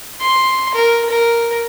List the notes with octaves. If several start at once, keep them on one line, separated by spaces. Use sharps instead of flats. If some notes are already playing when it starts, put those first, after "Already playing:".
C6
A#4
A#4